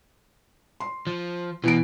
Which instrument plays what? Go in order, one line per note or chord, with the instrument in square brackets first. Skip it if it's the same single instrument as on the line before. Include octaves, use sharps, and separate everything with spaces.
[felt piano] C6
[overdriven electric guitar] F3
[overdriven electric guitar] B2 [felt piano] E3 D7